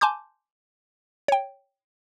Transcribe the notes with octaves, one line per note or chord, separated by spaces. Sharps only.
G#5 A5 C6 D6 G6
C#5 G5